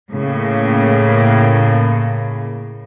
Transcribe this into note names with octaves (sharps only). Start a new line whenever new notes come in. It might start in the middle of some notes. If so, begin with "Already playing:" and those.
A2 C#3 A#3